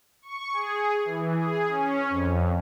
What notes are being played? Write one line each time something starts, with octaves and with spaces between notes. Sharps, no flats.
C#6
G#4
E3
G#4
C#4
F2